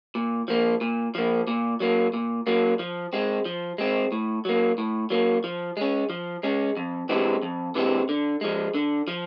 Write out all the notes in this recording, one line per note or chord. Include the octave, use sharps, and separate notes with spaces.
A#2
F3 A#3
A#2
F3 A#3
A#2
F#3 A#3
A#2
F#3 A#3
F3
G#3 C4
F3
G#3 C4
A2
F#3 A#3
A2
F#3 A#3
F3
G#3 C#4
F3
G#3 C#4
F2
C3 E3 G#3 C4
F2
C3 E3 G#3 C4
D3
F3 G#3
D3
F3